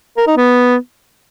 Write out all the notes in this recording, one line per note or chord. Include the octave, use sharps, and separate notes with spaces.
A#4
D#4
B3